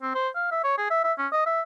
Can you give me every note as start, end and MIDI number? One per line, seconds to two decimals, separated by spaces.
0.02 0.13 60
0.15 0.29 72
0.35 0.49 77
0.52 0.59 76
0.64 0.78 73
0.78 0.89 68
0.90 1.01 76
1.04 1.13 76
1.18 1.27 61
1.32 1.45 75
1.46 1.61 76